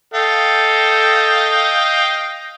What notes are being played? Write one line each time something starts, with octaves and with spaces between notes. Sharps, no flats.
A4 D#5 F5 G5